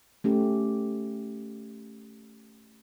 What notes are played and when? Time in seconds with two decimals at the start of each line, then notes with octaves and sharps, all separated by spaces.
0.24 A3 C#4 G4